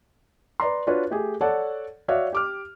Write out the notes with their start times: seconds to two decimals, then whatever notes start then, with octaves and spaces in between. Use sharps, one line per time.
0.60 B4 D5 A#5 C6
0.87 D4 F4 F#4 B4 C#5
1.11 A3 G4 G#4
1.41 A4 C#5 D5 F#5 A5
2.08 F#4 C#5 D5 E5 F5
2.33 G4 D6 F6